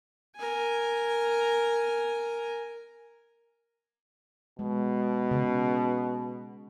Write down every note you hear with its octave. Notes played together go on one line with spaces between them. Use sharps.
A#4 G#5
B2 G#3
C#3